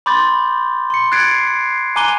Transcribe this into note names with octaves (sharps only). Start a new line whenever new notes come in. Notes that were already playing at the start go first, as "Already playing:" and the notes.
B5 C6 D6 G6 A6
C6 C#7
F#6 G#6 A6 C7 D7
C7
G#5 A#5 D6 F#6 D#7 G7